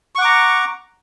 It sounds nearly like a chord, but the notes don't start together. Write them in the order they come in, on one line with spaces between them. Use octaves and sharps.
C#6 F#5 D6 A#5